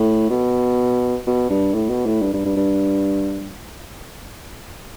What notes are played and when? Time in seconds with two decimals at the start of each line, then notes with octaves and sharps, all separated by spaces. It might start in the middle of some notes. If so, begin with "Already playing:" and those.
Already playing: A2
0.30 B2
1.27 B2
1.50 G2
1.74 A2
1.90 B2
2.06 A2
2.22 G2
2.34 G2
2.46 G2
2.57 G2